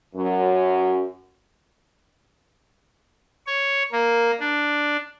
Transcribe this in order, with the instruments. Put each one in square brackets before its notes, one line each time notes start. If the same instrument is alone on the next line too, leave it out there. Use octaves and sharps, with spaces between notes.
[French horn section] F#2
[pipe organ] C#5
A#3
D4